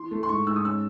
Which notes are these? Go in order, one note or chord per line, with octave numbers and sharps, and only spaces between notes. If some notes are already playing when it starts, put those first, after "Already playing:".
Already playing: E3 C6
A3
C6
G#2 C#6
G#2 E6
D#6
C#4 E6